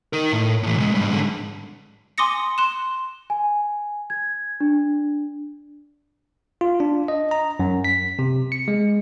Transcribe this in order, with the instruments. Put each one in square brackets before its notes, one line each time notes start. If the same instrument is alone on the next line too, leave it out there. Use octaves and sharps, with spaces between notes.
[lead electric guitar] D#4 A#4
A2
A2 E3
C2 G#3
G#2 G3
G#2 D3
[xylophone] G#5 C6 D6 D#6 A#6 C#7
C6 F#6 E7
[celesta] G#5
G#6
D4
[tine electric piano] F4
D4
D#5
A#5
F#2
B6
C3
C#7
G#3